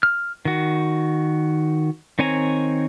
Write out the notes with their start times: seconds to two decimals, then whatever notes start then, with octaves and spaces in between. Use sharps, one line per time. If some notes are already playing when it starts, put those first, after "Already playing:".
0.03 F6
0.45 D#3 F#4
2.19 D#3 C4 C#5 G#5 A#5